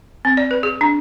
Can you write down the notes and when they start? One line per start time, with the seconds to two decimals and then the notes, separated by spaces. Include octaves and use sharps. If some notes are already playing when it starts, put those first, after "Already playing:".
0.25 C4
0.37 D5
0.51 B4
0.63 G#4
0.81 D4